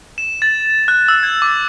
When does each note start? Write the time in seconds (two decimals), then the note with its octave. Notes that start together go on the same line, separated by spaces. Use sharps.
0.18 E7
0.42 A6
0.88 F#6
1.08 E6
1.23 G#6
1.42 D6